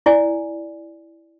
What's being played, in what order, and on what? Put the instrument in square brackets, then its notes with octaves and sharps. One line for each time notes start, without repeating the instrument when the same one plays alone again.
[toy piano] E4 D5 G#5